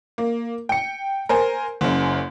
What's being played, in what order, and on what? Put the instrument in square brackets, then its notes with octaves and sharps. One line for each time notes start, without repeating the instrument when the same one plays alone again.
[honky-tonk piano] A#3
G5 C#7
A#4 C5 G#5
F#1 F#2